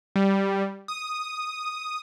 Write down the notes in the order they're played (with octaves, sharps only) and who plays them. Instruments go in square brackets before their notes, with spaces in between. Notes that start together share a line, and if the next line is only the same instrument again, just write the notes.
[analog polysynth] G3
D#6